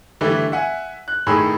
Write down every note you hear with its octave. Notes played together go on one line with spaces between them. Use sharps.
D3 E3 G3 A3 E4
E5 F#5 G#5
F#6
A2 D#3 G#4 B5 E6